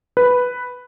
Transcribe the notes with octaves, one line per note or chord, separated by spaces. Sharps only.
B4